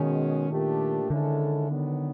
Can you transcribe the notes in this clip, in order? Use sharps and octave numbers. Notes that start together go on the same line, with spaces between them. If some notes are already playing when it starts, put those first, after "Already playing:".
Already playing: B2 D#3 G#3 C#4
A#2 F3 A3 D4 G4
D3 D#3 G#3 C#4 E4 A4
D#3 F#3 B3